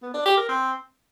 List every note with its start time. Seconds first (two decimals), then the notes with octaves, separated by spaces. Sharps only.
0.02 B3
0.14 D4
0.25 G4
0.37 A#4
0.49 C4